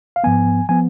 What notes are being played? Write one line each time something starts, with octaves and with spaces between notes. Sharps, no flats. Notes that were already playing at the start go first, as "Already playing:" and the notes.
F5
G#2 F3 B3 G#5
F3 B3 G#5